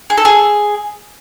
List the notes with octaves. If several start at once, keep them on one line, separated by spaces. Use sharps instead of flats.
G#4
A4
G#4